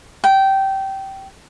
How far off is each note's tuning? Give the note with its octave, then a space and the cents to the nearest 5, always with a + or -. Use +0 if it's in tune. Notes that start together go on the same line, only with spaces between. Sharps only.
G5 -15